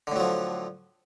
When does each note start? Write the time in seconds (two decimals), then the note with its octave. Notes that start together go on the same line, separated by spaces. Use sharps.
0.07 D3
0.12 A2
0.16 F#3
0.20 F3